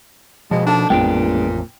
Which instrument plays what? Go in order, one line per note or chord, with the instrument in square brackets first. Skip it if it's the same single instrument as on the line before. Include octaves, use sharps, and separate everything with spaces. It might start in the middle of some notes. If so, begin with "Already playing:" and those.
[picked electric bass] B2 F3 [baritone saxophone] G#3
[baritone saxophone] D4 [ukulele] D#4 A4 A5
[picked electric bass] A1 F2 [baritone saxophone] A#2 [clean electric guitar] G#3 B3 D4 [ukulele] G5